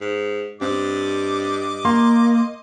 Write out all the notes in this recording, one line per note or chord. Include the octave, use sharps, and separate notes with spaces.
G#2
G2 C4 D#5 D6
A#3 C6